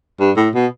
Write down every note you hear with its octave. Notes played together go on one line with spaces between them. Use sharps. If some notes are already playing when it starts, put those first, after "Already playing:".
G2
A2
B2